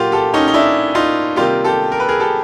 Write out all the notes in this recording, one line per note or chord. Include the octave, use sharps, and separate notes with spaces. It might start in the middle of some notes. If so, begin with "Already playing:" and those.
Already playing: A#2 F#3 A#3 F4 G4
G4 A4
C#4 D#4
D#4
D4 E4
D#4 F4
C3 D#3 G3 A#3 F4 G4
G4 A4
A#4
B4
G#4 A#4
G4 A4